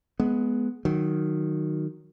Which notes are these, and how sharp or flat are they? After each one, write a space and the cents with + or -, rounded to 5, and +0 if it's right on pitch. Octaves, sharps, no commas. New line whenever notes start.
G#3 +25 B3 +0
D#3 -10 F#3 +0